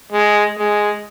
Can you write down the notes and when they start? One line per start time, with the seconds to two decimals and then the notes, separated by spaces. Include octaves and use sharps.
0.12 G#3
0.58 G#3